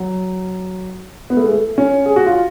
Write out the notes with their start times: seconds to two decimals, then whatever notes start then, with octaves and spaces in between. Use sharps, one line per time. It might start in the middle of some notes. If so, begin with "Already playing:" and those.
Already playing: F#3
1.30 B3
1.37 A3
1.44 G#3
1.51 A3
1.78 C#4
2.06 G#4
2.16 F#4
2.26 F4